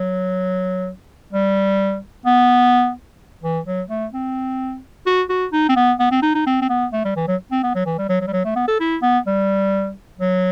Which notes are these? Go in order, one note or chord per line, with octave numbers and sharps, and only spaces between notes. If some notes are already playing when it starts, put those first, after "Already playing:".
Already playing: F#3
G3
B3
E3
F#3
A3
C4
F#4
F#4
D#4
C4
B3
B3
C4
D#4
D#4
C4
C4
B3
A3
G3
E3
F#3
C4
B3
F#3
E3
G3
F#3
F#3
G3
F#3
A3
B3
A4
E4
B3
G3
F#3